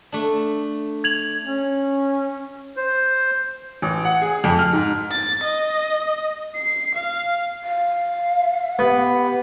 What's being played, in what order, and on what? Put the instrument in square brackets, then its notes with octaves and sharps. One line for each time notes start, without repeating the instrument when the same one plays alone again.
[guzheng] A3 D4
[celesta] G#6 F7 F#7
[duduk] C#4
[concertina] C5
[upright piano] A1
F#5
G#4
F2
F6
G#2
[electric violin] A6
D#5
C7
F5
[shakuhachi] F5
[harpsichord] B3 [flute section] G4 B4 F#5